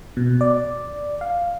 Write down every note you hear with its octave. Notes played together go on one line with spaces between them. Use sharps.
B2
D5
F5